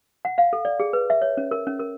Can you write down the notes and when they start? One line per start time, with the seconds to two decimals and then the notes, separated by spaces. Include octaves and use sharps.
0.25 F#5
0.38 F5
0.53 A4
0.65 D5
0.80 G#4
0.93 B4
1.10 E5
1.22 C#5
1.37 C#4
1.51 A#4
1.67 C#4
1.79 A#4